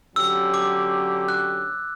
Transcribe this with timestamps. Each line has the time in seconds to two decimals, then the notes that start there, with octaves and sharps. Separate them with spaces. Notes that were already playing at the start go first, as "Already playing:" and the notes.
0.16 D3 F#3 C#4 G4 E6
0.54 D6
1.28 F#6